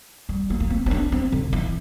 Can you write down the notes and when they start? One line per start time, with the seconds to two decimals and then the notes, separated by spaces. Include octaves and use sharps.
0.29 G3
0.50 A#3
0.60 A#3
0.70 C4
0.86 C4
0.91 D4
1.12 C4
1.32 D3
1.53 E3